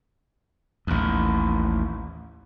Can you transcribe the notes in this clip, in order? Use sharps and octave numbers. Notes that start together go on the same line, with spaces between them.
A1 D#2